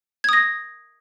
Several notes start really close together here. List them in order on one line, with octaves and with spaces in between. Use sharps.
G#6 D#6 A#6